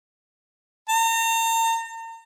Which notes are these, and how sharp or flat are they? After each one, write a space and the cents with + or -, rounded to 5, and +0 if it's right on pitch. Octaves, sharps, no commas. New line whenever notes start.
A#5 -40